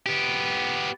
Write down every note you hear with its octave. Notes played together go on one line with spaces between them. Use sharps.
B3 G4